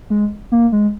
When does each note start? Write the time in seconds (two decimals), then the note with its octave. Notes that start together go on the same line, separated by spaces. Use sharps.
0.10 G#3
0.52 A#3
0.72 G#3